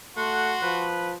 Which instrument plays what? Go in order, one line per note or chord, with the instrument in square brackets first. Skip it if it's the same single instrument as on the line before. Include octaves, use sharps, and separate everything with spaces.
[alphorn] A3 [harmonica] F#4 C6 [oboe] F#5
[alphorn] F3 [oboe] B4